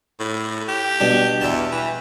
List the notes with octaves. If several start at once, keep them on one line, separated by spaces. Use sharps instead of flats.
A2
G4
B2 G3 D4
E2 E5 A5
E3